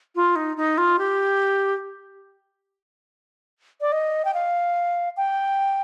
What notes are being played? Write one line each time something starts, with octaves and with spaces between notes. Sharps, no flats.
F4
D#4
D#4
F4
G4
D5
D#5
G5
F5
G5